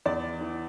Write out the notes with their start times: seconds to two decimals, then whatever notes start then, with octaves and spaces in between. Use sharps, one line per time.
0.06 E2 D5
0.41 E3